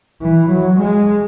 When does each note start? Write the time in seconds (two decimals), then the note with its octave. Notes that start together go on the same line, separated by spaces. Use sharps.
0.22 E3
0.51 F#3
0.80 G#3